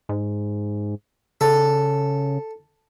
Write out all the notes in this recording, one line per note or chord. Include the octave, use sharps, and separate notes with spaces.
G#2
C#3 A4